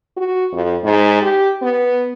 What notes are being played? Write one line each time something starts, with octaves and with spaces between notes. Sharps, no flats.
F#4
F2
G#2
G4
B3